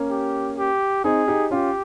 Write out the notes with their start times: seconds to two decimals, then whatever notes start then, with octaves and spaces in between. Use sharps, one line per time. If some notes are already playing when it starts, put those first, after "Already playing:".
Already playing: A#3 C#4
0.10 G4
0.58 G4
1.04 C4 D#4 G#4
1.28 D#4 G4
1.51 C#4 F4 G4